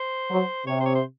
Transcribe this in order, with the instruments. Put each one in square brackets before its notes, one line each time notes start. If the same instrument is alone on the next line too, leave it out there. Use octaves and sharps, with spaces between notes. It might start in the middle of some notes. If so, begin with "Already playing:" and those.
Already playing: [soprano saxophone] C5
[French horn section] F#3
[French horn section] C3 [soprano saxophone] C#5
[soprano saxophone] C5
C#5
C5